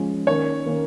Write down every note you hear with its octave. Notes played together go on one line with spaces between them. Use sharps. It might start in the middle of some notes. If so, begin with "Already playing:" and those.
Already playing: F3 G#3 C#4
D#3 A#3 C#4 C#5
D#3 A#3 C#4